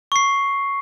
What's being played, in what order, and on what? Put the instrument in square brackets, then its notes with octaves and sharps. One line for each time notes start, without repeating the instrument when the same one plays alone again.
[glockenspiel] C#6 C7